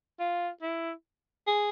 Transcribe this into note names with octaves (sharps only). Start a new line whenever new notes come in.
F4
E4
G#4